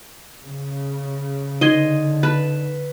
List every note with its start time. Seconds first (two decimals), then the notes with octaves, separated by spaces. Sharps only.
0.42 C#3
1.61 D3 D#4 D#5 C6 G#6 D#7
2.23 B4 A5